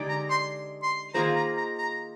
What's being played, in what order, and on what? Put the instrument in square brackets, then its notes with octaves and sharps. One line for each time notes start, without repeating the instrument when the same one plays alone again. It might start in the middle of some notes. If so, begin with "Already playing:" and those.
Already playing: [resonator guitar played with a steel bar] D3 G#3 D#4 G4 D5
[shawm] A#5
C6
C6
[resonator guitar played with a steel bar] D#3 A#3 F4 G#4 C5 [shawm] A#5
[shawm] A#5
A#5
A#5